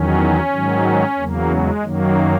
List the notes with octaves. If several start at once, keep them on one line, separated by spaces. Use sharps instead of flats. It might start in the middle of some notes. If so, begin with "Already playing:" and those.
Already playing: E2 D#3 F#3 C#4
G#2 D#3 F#3
E2 C#3 F#3 A#3
G#3
F#2 D#3 F#3 A#3